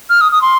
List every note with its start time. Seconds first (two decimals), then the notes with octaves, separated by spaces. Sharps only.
0.10 F6
0.21 D#6
0.32 D#6
0.42 C6